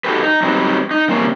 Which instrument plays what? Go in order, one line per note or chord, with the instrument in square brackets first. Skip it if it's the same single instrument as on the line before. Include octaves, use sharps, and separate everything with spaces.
[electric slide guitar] D#4 F#4 G4 A4 B4
D#4
F#3 G3 C4 D#4 B4
D#4
C3 G3 A#3 C#4 C5